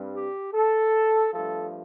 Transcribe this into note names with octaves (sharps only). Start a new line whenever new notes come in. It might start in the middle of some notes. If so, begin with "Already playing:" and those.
Already playing: G2 G3 C4
G4
A4
G2 F3 A3 A4